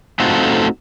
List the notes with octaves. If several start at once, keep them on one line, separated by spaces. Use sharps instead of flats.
A3 C4 D#4 F4 F#4 A4